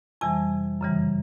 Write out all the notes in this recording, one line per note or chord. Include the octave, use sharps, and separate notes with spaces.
F2 C3 E3 G3 G#5
F#2 C#3 E3 G3